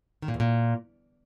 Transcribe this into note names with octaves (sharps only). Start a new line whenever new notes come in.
D#3
A#2
E2
A#2